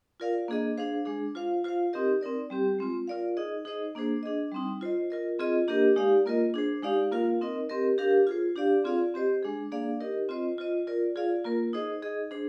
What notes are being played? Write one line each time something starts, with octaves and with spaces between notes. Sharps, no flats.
F4 A#4 D5 F5
A#3 D4 G#4 D#5
D4 G#4 C5 F5
G#3 D4 G#4
F4 C5 F5
F4 C5 F5
C4 D#4 G4 A#4 D#5
C4 D#4 A#4 D5
G3 C4 G4
G#3 C4 F4
F4 A#4 D5 F5
D#4 G#4 D#5
D#4 G#4 C5 D#5
A#3 D4 G#4 C5
D4 G#4 D#5
G3 C4 D#4
F4 C5 D#5
F4 A#4 D#5
C4 F4 G#4 D#5
A#3 D4 G4 A#4 D#5
G#3 D#4 G4 D5 F5
A#3 F4 A#4 D#5
D4 G#4 C5
G#3 D#4 G4 D5 F5
A#3 F4 A#4 F5
C4 D#4 A#4 D#5
C4 G4 A#4 D#5
D4 G4 A#4 F5
F4 G#4 C5
D4 G4 D5 F5
C4 F4 G#4 D5 F5
C4 G4 C5 D#5
G#3 D4 G#4
A#3 D4 G#4 D5 F5
D#4 G4 A#4 D#5
C4 F4 C5 D#5
F4 C5 D#5
F4 A#4 D5
F4 G#4 D5 F5
A#3 F4 A#4
D#4 G#4 C5 D#5
D#4 G#4 D#5
D4 G#4 C5